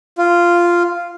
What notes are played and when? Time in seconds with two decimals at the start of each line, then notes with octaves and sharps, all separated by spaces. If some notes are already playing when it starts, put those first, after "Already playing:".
0.18 F4